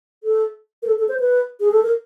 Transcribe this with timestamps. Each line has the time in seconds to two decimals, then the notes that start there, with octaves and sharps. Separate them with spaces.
0.23 A4
0.82 A#4
0.87 A4
0.98 A4
1.08 C5
1.20 B4
1.60 G#4
1.71 A4
1.83 A#4